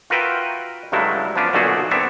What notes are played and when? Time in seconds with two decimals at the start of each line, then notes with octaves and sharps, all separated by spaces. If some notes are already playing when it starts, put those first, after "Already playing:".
0.10 F4 F#4 A#4 B4 E5 G5
0.92 G2 C#3 F#3 G#3 A3 E4
1.35 F3 B3 C#4 D4
1.53 B1 A#2 D3 A3 F#4 G#4
1.91 B3 C4 D4 C#5 E5